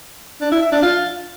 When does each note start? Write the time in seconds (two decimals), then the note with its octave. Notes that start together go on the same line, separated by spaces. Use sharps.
0.41 D4
0.51 E4
0.62 E5
0.72 D4
0.82 F4